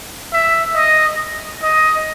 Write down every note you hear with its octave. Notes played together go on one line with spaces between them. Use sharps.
E5
D#5
D#5